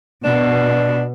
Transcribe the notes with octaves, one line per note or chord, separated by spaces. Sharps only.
B2 D4